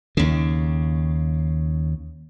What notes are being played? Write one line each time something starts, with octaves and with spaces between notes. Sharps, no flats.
D#2 C#3